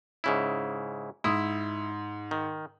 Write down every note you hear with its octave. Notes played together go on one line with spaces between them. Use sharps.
G#2 C#3 E4
G#2 E4 D#6
D#3